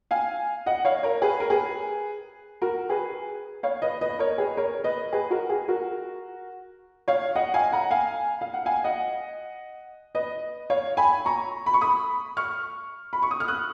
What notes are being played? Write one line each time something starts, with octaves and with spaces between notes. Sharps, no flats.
F5 G#5
D#5 F#5
C#5 F5
A#4 C#5
G#4 B4
A#4
G#4 B4
F#4 A#4
G#4 B4
C#5 F5
B4 D#5
B4 D#5
A#4 C#5
G#4 B4
A#4 C#5
B4 D#5
G#4 B4
F#4 A#4
G#4
F#4 A#4
C#5 F5
D#5 F#5
F5 G#5
F#5 A#5
F5 G#5
F5
F#5
F5 G#5
D#5 F#5
B4 D#5
C#5 F5
G#5 B5
A#5 C#6
B5
C#6
B5 D#6
C#6 F6
B5
C#6
D#6
F6
D#6 F#6